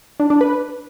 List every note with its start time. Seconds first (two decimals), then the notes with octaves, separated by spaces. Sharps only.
0.20 D4
0.30 D4
0.41 B4